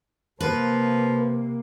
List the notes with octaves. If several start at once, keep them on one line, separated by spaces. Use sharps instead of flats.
C3 F3 A#3 B4